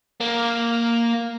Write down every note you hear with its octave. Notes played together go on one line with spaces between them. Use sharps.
A#3